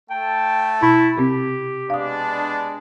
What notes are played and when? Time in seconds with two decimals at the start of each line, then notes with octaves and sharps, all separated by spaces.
0.10 A3 G5 A5
0.82 B2 E4 E6
1.18 C3 C4 G4
1.90 G#3 B3 D4 F5 D#6